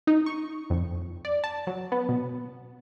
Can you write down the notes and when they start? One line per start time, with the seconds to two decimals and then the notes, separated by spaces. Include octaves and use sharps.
0.07 D#4
0.26 C#6
0.70 F2
1.25 D5
1.44 A5
1.67 F#3
1.92 B3
2.09 B2